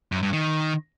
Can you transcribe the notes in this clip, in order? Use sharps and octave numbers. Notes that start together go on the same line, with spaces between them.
F#2
G2
D#3